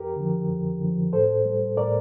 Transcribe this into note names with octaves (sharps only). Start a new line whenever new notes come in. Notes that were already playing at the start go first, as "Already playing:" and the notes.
Already playing: F2 G4 A#4
D3 F3
F2
D3 F3
A2 A4 C5
G3
A2 A#4 D5